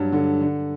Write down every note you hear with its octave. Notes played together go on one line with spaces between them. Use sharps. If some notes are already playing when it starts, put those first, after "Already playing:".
Already playing: G2 F#3
D3
D3